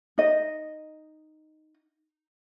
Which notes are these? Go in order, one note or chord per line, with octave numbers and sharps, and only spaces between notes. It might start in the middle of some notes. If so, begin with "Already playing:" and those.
D#4 D#5